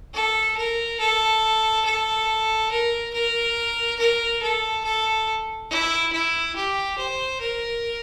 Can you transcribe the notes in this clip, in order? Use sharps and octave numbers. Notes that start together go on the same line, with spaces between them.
A4
A#4
A4
A4
A#4
A#4
A#4
A4
A4
E4
E4
G4
C5
A#4